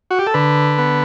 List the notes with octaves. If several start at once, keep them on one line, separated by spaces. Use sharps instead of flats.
F#4
G4
A4
D3 B4
B3